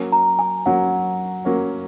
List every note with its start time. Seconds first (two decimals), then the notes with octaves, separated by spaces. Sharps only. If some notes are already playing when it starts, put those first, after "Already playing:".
Already playing: F#3 A#3 C#4
0.12 A#5
0.39 G#5
0.65 F#3 A#3 C#4 F#5
1.45 F#3 A#3 C#4